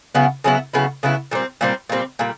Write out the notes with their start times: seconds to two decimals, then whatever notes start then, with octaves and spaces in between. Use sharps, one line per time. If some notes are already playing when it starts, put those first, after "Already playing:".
0.15 C#3 F#3 B3 E4
0.44 C#3 F#3 B3 E4
0.74 C#3 F#3 B3 E4
1.03 C#3 F#3 B3 E4
1.31 A#2 G3 C4
1.61 A#2 G3 C4
1.89 A#2 G3 C4
2.19 A#2 G3